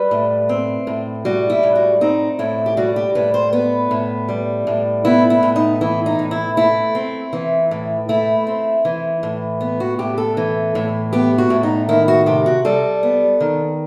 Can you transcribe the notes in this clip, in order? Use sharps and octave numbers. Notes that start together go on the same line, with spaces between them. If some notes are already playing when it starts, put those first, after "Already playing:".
Already playing: G3 B4
A2
C4
A2
G3 F#4
E4
A2
F#4
C4 D#4
A2 E4
G4
G3 F#4
G4
A2 B4
C5
B3 B4
A2
G3
A2
B3 E4
E4
A2
D#4
E3 E4
D#4
A2
E4
A3 E4
C4
E3
A2
A3 E4
C4
E3
A2
B3
F#4
A2 G4
A4
E3
A2
B3 G4
F#4
A2
D#4
D#3 E4
F#4
C3 G4
F#4
G3 A4
B3
D#3